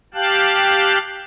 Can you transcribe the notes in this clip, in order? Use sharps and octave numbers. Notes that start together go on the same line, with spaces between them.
G4 F5 G5 A5 F#6